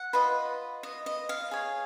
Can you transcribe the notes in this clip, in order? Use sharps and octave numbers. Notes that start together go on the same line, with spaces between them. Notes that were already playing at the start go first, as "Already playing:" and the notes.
Already playing: F#5
F4 B4 D#5
D#5
D#5
F5
G#4 C#5